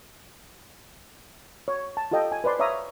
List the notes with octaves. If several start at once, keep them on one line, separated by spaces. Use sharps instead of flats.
C#5
A5
F4 G4 A4 D#5 G5
G#5
B4 C5 D5 C6
C#5 E5 F5 A#5 D#6